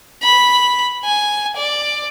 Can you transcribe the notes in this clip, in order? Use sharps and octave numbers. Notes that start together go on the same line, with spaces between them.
B5
G#5
D5